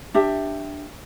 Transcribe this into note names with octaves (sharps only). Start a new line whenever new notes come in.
D4 G4 E5